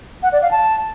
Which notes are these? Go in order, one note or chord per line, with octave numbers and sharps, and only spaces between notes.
F#5
D5
F5
A5